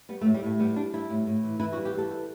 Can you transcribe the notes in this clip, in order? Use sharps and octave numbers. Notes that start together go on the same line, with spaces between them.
G3 B3
A3
A2
G3
A2 A3
G3 B3
G3 D4
G3 E4
A2
A2
E3
E3 E4
F#4
G3
G4
E3 A4
G3